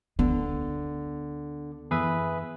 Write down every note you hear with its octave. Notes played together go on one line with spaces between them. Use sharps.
D2 D3 B3
F#2 E3 B3 G#4 B4 E5